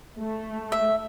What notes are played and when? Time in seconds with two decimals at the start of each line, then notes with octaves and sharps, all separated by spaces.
0.17 A3
0.72 E5